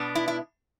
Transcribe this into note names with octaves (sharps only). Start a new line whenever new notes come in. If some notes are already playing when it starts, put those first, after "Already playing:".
Already playing: B2 B3 D4
E4
E4